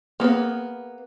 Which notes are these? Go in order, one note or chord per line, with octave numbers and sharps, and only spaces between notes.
A#3 B3 G#4 B4